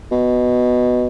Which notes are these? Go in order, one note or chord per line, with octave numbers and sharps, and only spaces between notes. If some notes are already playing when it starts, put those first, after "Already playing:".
B2